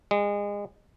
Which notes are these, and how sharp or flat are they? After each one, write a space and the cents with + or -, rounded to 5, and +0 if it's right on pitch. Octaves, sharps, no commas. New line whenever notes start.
G#3 -30